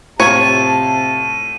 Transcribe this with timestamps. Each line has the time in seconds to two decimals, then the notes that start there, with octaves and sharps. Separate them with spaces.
0.20 A2 C3 F4 C#5 A5 G#6 D#7